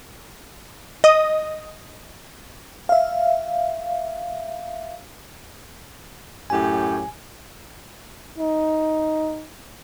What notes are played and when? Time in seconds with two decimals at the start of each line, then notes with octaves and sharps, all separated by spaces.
1.04 D#5 D#6
2.89 E5 F5
6.50 F#2 A2 G4 G#5
8.38 D#4